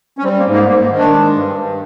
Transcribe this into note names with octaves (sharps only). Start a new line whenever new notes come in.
C#4
G3 C4
A#3
G#2
A#3
G#2 A#3
D#3
D4
G#3
G2
G2